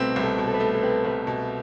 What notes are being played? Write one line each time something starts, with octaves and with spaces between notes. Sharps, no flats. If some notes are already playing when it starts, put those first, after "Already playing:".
Already playing: C2 B2 A3 C4 B4
C2
A4
B2
A4
B4
A3
A4
C4 B4
C2 B4
B2